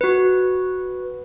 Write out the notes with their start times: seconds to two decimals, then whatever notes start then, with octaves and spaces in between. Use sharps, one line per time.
0.01 F#4 B4